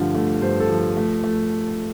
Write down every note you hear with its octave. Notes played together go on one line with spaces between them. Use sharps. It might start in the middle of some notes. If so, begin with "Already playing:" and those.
Already playing: G2 D3 F3 A3 F5
A3
G2 C5
A4
F3
A3
A3